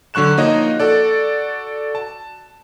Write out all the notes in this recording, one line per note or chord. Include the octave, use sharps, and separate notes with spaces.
D3 F#3 C#6 F#6 E7
F3 A#3 D#4 F#4 C#5 D#5
F#4 A4 D5
A5